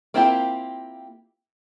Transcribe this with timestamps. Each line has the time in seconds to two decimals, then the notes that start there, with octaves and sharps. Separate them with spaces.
0.14 A#3 C4 E4 F4 G4